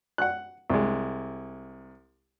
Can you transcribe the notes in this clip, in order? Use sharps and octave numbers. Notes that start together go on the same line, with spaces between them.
F#5 F#6
C2 G#3